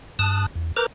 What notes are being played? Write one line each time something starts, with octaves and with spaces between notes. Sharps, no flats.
G2 A5 D#6 F#6
E2
A#4 B4 A#5 D6 G6